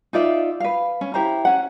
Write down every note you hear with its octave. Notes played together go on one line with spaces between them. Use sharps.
D#4 F4 D5 E5
B4 F5
C#4
E4 G4 C5 A#5
C#4 F#5